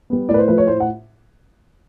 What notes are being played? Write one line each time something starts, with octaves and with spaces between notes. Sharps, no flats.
G3 B3
A2 D5
B4
C5
F3 A3 B4
C#5
A2 C5
F#5